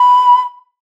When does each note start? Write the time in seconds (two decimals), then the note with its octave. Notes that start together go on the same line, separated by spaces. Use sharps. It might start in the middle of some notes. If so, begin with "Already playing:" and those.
Already playing: B5